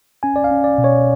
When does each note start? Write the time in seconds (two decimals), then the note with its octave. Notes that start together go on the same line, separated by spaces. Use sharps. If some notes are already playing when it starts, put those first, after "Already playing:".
0.23 C#4 G#5
0.36 D5
0.44 F5
0.51 C#4
0.64 D5
0.78 B2
0.84 C#5